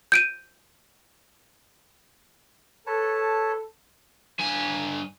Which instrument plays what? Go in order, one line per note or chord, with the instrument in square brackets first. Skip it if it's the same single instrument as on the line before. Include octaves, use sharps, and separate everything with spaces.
[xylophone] G6 D7 D#7
[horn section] A4 [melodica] B4 C#5 A5
[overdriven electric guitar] G2 G#5